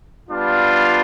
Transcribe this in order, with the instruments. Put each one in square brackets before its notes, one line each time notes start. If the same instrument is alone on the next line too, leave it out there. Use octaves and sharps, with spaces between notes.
[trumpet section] G3 B3 D4 F4